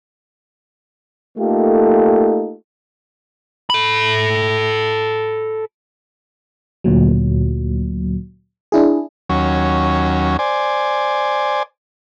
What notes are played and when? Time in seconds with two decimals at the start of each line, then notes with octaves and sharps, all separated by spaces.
1.38 A3 A#3 D#4 F4 G4 A4
3.70 A4 B5
6.84 D2 A#2 F#3
8.72 D4 E4 G#4
9.30 D#2 F#3 C#4
10.39 C5 D5 G#5